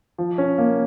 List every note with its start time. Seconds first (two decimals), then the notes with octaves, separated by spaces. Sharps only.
0.18 F3
0.38 C#4
0.58 A#3